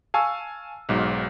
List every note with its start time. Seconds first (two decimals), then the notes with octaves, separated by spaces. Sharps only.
0.14 F5 G#5 A5 C#6 E6
0.89 B1 G#2 F#3